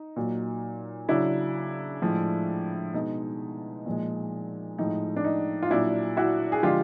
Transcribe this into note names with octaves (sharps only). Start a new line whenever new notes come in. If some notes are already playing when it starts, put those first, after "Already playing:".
Already playing: D#4
A#2 F#3
C#3 F#3 D4 E4
A2 F3 G#3
B2 G#3 D#4
A#2 F3 G#3
A2 F3 G#3 D#4
D4
D#4
F4
A#2 F#3 D4 E4
E4 F#4
G#4
D3 F3 G#3 F4 G4